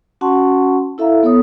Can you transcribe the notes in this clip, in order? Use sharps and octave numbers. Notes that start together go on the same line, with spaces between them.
C#4 F#4 F#5 A5 C6 C#6
E4 A4 E5 F5 A#5
B3 A4 C#5 D#6